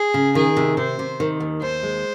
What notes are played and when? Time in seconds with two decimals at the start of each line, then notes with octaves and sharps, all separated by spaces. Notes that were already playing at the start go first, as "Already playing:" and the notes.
Already playing: G#4
0.14 C#3
0.35 D#3 G#4
0.57 C3
0.77 C3 C5
0.99 C3
1.20 D#3
1.40 D#2
1.62 D#2 C5
1.83 G#3